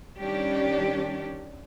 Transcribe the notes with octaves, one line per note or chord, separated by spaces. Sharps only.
D#3 G3 C#4 D4 G4